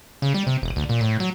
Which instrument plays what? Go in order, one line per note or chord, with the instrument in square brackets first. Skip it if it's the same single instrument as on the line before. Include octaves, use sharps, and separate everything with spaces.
[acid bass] C#3
G3
C3
E1
D2
A#2
A2
F#3